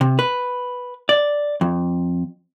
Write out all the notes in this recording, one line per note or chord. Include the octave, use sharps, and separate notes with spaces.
C3
B4
D5
F2